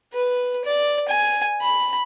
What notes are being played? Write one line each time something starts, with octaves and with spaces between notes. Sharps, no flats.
B4
D5
G#5
B5